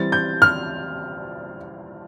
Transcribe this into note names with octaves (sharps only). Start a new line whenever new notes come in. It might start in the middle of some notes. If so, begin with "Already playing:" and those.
Already playing: E3 G3 C4 A6
G6
F6